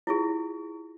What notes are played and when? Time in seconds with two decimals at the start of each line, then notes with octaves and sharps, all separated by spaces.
0.07 E4 F4 G#4